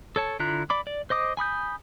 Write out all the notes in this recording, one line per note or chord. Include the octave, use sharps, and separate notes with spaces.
A4 C#5 A5
D3 E4 F4 A#5 F#6
D5 B5 D6
D5
C5 D#5 D6 D#6
G#5 B5 D#6 G6